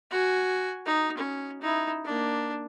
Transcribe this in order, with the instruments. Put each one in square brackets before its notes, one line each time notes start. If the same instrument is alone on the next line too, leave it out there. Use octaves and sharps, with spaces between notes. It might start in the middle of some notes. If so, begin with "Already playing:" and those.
[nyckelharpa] F#4 G#5
D#4
C#4
D#4 E4
A#3 D4